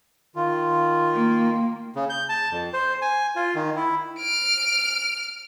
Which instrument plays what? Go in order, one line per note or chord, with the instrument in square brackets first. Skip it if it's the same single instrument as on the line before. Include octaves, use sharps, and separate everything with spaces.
[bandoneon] D#3 F4
[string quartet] A#3
[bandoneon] C#3
G6
A5
F2
C5
G#5
F4
D#3
E4
[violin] F6 D7